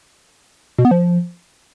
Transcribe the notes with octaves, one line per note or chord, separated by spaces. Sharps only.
B2
B3
F3